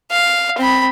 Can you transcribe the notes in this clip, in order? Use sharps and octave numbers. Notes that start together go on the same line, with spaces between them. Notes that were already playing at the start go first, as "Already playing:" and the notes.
F5
C4 B5